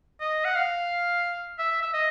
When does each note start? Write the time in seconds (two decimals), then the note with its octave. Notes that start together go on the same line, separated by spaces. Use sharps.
0.21 D#5
0.45 F#5
0.56 F5
1.59 E5
1.82 E5
1.94 D#5